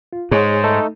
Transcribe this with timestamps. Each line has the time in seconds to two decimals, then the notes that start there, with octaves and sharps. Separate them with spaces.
0.13 F4
0.31 G#2 G#3 G#4 C#5
0.64 A3 D#4 A4